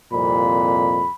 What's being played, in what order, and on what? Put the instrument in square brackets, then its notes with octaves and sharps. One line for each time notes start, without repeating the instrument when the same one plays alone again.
[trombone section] C2 F2 A#2 [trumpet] B5